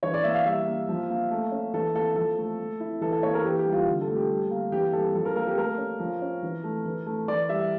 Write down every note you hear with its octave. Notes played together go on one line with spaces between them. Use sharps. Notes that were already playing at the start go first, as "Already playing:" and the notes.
E3 C#5
D5
A#3 E5
F5
G3 E5
A#3
F3
A#3
A3
C#4
E3 A4
A#3 A4
F3 A4
A3
A3
E4
E3 A4
A4
A#3 C#5
A#4
E3 G4
G4
G3
F4
D3
A4
A3
G4
G3
A#3
E3 G4
G3 A4
F3 A4
A#4
A#3 A#4
G4
A3 A#4
C#4
F3
C#4
E3
A3
E3
A3
E3 D5
G3 E5